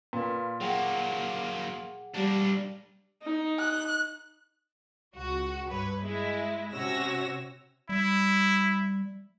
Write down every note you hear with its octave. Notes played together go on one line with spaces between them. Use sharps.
A#2 B4 F5 C6
F#3 A#3 G#4 F#5 G5
G3 A#3 D4
D#4
F#6
C#2 F#4
G2 B4 C#5
G#3 E4
C3 C#4 F#4 C#5 E6 A#6
G3 E4